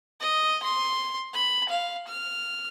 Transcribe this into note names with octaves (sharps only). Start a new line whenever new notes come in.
D#5
C6
B5
F5
F6